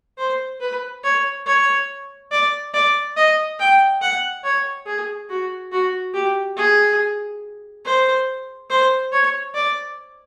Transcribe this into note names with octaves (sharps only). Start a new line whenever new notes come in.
C5
B4
C#5
C#5
D5
D5
D#5
G5
F#5
C#5
G#4
F#4
F#4
G4
G#4
C5
C5
C#5
D5